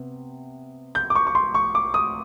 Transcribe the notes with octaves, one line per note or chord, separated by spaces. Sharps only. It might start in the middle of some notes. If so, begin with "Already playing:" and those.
Already playing: C3 B3
G6
D6
C#6
C#6
C6
C#6
D6
D#6